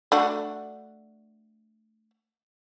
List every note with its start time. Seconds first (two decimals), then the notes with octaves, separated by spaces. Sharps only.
0.12 A3 D4 F#4